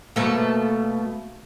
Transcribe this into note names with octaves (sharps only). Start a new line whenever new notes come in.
B2 A3 A#3